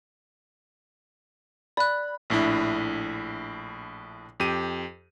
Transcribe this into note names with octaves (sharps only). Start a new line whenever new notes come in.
D5 B5 F#6
A#1 A2 D4 E4
F2 G4 D#7